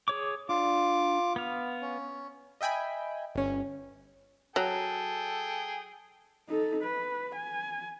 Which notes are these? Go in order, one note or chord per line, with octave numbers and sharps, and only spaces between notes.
G#4 C#5 D6
D4 F4 D6
B3 F5
C#4
D#5 E5 G5 G#5 B5
G1 C#4
F#3 G#4 A4 G5
D#4 A4
B4
G#5